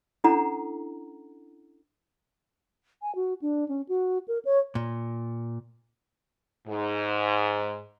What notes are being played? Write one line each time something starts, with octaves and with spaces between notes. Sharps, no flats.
C#4 D4 E4 A4 F#5 A#5
G#5
F#4
D4
C#4
F#4
A#4
C#5
A#2
G#2